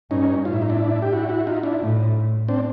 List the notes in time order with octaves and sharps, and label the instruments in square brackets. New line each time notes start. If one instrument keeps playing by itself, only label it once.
[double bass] G2 [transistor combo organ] C#4 D#4
[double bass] A2 [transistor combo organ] F4
[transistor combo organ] E4
D#4
D4 E4
G4
E4 F#4
E4 F#4
D#4 F4
D4 E4
[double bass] A2
[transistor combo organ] C4 D4